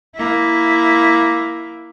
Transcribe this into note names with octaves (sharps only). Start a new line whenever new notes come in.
A#3 E4